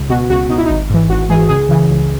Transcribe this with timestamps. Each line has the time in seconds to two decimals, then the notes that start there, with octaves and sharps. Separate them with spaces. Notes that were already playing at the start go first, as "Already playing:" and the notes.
Already playing: C#2
0.09 B2 F#4
0.30 C#2 F#4
0.49 B2 D#4
0.58 E4
0.66 G#1 D#4
0.90 G#2 E3
1.09 G#1 F#4
1.29 G#2 E3 G#4
1.49 C#2 G#4
1.69 C#3 E3
1.90 C#2